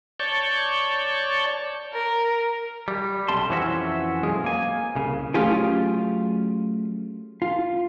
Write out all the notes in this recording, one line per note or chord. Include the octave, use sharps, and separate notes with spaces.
C#5 D5 A5 C#6 G6
A#4
G3
B1 C3 G3 A5 C6
F2 E3 C4 C#4 F#4 E5
B1 F#2 G#3 F4 G#4
A#3 G#5
C2 C#3
F#3 A3 C#4 F4 G4 G#4
F4